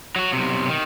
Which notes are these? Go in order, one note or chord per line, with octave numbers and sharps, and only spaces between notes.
F#3 F#4
B1 C3
D#3